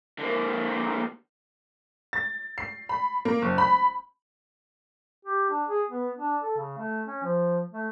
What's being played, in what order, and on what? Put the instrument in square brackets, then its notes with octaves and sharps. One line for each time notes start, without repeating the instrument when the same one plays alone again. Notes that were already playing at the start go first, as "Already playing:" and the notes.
[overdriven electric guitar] D3 A#3
[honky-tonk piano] A6
C7
B5
A#3
F#1
B5
[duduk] G4
D4
G#4
B3
D4
A4
C#3
A3
C#4
F3
A3